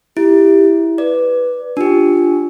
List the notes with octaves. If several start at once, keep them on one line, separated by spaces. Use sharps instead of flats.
E4 G4
B4 D5
D4 F4 G4